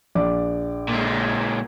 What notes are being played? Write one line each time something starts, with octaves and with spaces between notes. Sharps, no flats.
A#1 D5 D6
A#2 G#3